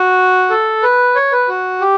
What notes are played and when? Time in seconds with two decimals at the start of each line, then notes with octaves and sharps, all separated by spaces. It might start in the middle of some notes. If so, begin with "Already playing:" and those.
Already playing: F#4
0.50 A4
0.83 B4
1.15 C#5
1.32 B4
1.49 F#4
1.81 G4